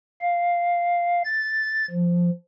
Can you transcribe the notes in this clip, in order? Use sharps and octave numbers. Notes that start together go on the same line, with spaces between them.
F5
A6
F3